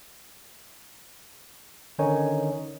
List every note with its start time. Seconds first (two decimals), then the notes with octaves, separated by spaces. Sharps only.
1.99 D3 D#3 C#4 D#4 C#5 G#5